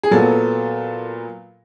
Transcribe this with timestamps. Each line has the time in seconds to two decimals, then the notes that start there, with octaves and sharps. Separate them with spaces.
0.03 G#4
0.11 A#2 F#3 B3 A4